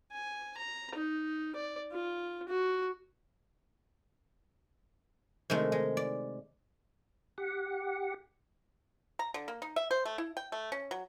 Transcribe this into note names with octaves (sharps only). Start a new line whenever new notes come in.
G#5
A#5
D#4
D5
F4
F#4
C3 D#3 G#3 A3
G#3
D5
G4 F#5
A#5
D3
A#3
D#4
E5
C5
A3
E4
G5
A3
C#4
F#3